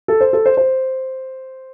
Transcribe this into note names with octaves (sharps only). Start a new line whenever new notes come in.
A4
C5
A4
C5
C5